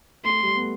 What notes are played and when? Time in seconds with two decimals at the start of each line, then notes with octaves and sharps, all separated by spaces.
0.25 A3 C6
0.43 G3
0.55 B3
0.61 A3